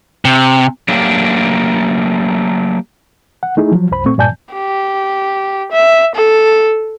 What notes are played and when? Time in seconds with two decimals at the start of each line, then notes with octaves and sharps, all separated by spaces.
0.25 C3
0.88 F#3 A3 A#3 D4 G4
3.43 F#5
3.57 A3 D#4 E4 G#4
3.72 F3 F#3
3.91 C2 F#2 C5 B5
4.05 A#2 A3 C4 C#6
4.18 G2 A#2 D5 G#5 A5 G6
4.53 G4
5.71 E5
6.15 A4